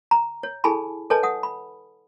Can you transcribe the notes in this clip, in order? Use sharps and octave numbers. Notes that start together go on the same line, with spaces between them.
A#5
C#5
E4 G#4 A4 G#5 A5 B5
A4 B4 C#5 D#5 G#5 A5
F#5 D#6
B5